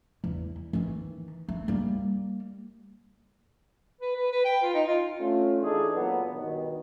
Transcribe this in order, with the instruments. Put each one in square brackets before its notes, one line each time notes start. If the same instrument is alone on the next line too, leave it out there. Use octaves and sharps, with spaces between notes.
[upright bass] E2 E4
D#3 E3
A3 C4
G3 A#3
[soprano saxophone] B4
B4
B4
G5
F4
D#4
F4
[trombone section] A3 C#4 D4 F4
E3 D4 D#4 G#4 A4
A#2 F#3 B3
G2 B2 D#3